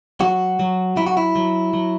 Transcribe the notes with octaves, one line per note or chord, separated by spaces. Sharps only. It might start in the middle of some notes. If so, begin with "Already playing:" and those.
F#3 F#4
F#3
F#3 E4
F#4
E4
F#3
F#3